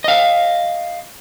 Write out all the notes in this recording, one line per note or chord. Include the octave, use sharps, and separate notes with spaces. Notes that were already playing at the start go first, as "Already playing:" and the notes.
D#5 F5